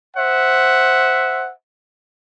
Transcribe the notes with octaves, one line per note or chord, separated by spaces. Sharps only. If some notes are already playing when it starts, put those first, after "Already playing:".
C5 E5 F#5